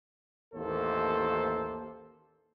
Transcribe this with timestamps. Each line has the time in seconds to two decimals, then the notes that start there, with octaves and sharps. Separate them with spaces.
0.55 A1 D#2 A#3 A4 C5